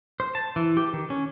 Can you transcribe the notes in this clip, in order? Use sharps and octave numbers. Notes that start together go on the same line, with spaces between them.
C5
A5
E3
G4
D#3
C#4